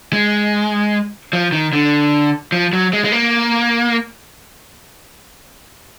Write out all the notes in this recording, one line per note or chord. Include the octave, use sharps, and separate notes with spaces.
G#3
F3
D#3
D3
F3
F#3
G#3
G#3
A#3